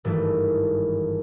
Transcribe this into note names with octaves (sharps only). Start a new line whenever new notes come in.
G#1 G2 E3 A3